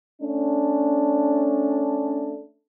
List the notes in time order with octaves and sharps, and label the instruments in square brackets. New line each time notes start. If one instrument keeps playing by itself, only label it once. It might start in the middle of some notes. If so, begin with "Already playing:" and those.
[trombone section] A3 C#4 D4